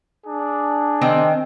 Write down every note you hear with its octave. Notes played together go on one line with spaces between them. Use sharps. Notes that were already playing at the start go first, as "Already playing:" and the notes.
D4 G#4
D#3 C4 G5